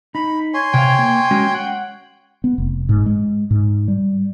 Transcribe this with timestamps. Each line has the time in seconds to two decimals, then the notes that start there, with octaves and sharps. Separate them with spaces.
0.15 D#4 B5
0.54 C#5 G#5 C6
0.74 C3 F5 G5
0.99 A#3
1.31 G#3 C#4 F#4
1.54 F#5
2.44 B3
2.58 F1
2.89 G#2
3.06 G#3
3.51 G#2
3.88 G3